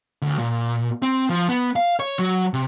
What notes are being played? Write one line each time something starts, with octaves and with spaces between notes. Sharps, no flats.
D2
A#2
C4
F3
B3
F5
C#5
F#3
C3